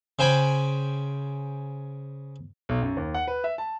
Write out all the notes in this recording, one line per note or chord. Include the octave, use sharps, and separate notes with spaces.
C#3 C5 G5 G#5 B5
B1
F#2
D#2
F#5
B4
E5
A5